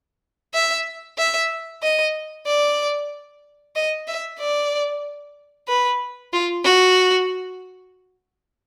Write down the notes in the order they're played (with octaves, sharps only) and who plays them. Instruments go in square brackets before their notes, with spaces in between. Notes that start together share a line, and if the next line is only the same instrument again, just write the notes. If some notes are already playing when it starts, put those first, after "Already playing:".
[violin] E5
E5
D#5
D5
D#5
E5
D5
B4
F4
F#4